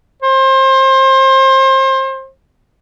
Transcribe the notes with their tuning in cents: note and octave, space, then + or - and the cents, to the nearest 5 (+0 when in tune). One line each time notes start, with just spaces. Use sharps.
C5 +30